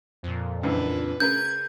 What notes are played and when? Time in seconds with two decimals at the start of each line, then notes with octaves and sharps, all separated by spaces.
0.23 F2 A#2
0.63 C#2 F#2 E3 D4 B4
1.20 C#3 C#4 A#4 B4 G6 G#6